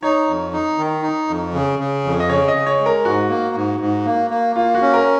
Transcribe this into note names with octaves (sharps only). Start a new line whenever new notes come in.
D#4 C#5
F2
D#4
D#3
D#4
F2
C#3
C#3
F2
D#5
C#3 C#5
D#5
C#3
C#5
G#3
A#4
G#2 F#4
A#3
G#2
G#2
A#3
A#3
A#3 F4
F#4
C#4
A#4